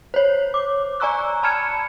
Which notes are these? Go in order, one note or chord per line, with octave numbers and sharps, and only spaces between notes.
C5 C#5
D6
D5 G#5 A#5 C#6 E6 F#6
A5 B5 F6 G#6 C#7 E7